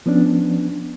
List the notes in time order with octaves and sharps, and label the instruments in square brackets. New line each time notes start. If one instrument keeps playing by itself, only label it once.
[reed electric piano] F3 B3 C#4 D4